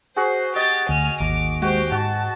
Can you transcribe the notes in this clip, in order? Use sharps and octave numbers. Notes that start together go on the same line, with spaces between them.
F#4 G#4 C5
G4 D#5 A6
D2 G#5 F6
G#1 D#2 D6
G#3 F#4 G4 C5
G#2 F#4 A5